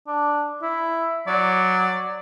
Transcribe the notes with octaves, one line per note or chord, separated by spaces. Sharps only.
D4
E4
F#3 D5